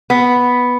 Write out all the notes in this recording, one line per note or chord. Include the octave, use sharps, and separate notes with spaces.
B3